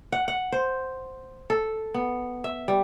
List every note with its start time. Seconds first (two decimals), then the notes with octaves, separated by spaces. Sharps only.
0.12 F#5
0.28 F#5
0.52 C5
1.50 A4
1.94 B3
2.44 E5
2.68 G3